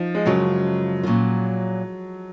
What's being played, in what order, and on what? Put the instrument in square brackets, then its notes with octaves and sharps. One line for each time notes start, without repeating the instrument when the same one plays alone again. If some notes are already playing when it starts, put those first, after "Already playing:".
Already playing: [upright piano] F3 [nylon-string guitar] D#4
[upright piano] G#3
[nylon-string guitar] F#2 C#3 F3 G#3 [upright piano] F#3
[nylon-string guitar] A#2 F#3 C#4 F4